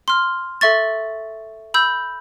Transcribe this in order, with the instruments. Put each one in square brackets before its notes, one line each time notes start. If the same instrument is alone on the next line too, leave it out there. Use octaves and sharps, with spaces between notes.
[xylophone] C6 F6
A4 E5 C#6 A6
B5 E6 G6